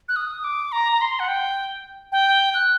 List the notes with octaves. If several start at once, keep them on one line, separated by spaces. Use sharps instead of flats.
F#6
D#6
D6
A#5
A#5
C6
F#5
G5
G5
F#6